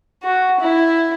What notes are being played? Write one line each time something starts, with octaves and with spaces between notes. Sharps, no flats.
F#4
E4